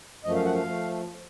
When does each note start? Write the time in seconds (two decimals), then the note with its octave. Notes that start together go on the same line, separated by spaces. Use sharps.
0.24 F#2 F3 A3 D#5
0.34 F5
0.45 F#5
0.54 F5
0.66 F3 A3